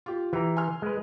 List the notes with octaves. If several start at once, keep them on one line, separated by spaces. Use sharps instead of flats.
F4 G4
E3 G4 A#5
G#5 C6 F6
G#3 B4